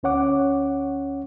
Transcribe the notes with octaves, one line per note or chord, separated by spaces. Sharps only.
D2 C#4 C#5 F#5 D6